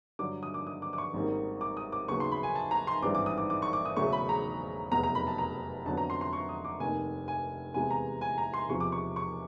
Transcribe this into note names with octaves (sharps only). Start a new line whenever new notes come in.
G2 D3 F#3 D6
D#6
D6
D#6
D6
D6
C#6
G#1 F#2 D#3 G3 A#3
D6
D#6
D6
D#2 C#3 F#3 B3 C#6
C6
B5
G#5
A5
A#5
C6
G#1 G2 E3 G3 D6
D6
D#6
D6
D6
C#6
D6
D#6
E1 E2 C#3 F#3 A3 C#6
B5
A#5
F1 E2 B2 F#3 A#5
A#5
B5
A5
A#5
F2 D3 F#3 B3 A5
A#5
C6
C6
C#6
D#6
D6
F1 D#2 D#3 G#5
G#5
E2 C3 E3 G#3 B3 G#5
A#5
G#5
A#5
C6
E1 E2 C3 F3 C#6
D6
C#6
C#6